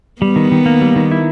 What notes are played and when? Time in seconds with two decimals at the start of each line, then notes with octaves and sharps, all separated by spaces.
0.22 G3 B3
0.36 D#3
0.52 D#3
0.66 A#3
0.81 G3
0.96 D#3
1.11 E4